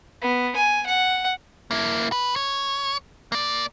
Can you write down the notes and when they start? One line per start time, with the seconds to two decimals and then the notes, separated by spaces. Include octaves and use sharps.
0.22 B3
0.56 G#5
0.86 F#5
1.71 A#3 E4
2.12 B4
2.36 C#5
3.32 A#3 D5